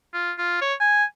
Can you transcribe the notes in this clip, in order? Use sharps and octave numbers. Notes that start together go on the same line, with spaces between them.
F4
F4
C#5
G#5